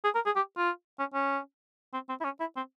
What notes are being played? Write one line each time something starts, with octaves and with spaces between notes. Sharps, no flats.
G#4
A#4
G#4
G4
F4
C#4
C#4
C4
C4
E4
C#4
E4
C4